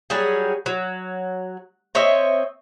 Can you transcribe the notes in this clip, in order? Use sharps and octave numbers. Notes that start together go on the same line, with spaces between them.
F#3 G3 C#4 G#4
F#3
C4 C#5 D#5 E5